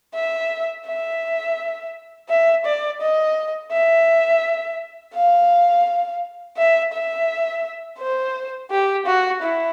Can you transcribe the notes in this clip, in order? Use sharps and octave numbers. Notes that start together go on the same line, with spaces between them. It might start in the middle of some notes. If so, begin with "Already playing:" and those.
E5
E5
E5
D5
D#5
E5
F5
E5
E5
C5
G4
F#4
E4